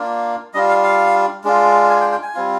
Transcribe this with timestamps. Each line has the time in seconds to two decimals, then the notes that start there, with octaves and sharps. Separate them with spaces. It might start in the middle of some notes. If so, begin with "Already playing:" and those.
Already playing: A#3 D4 F4
0.54 G3 D4 F4 D#5
0.69 F5
0.83 F5
1.44 G#3 D4 F4
1.90 G#5
2.01 G5
2.12 G5
2.23 G#5
2.34 G3 C4 F4